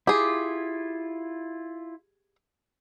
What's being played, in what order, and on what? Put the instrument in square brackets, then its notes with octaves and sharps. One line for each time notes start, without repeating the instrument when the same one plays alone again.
[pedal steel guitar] E4 F4 [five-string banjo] G4 G#4